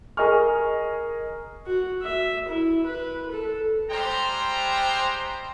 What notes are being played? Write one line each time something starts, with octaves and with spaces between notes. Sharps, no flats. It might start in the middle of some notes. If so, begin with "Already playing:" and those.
G#4 A#4 D#5 G#5 C#6 F6
F#4
E5
E4
B4
A4
G3 G#3 C5 G5 A#5